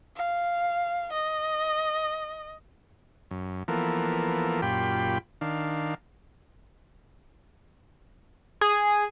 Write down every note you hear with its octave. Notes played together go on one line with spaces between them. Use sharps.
F5
D#5
F#2
E3 F3 A#3 B3 A4 A#4
F#2 A#2 F4 G4 G5 B5
D#3 D4 F5
G#4